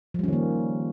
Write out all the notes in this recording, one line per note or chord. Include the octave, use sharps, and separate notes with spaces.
D#3 F3 G3 A#3 C#4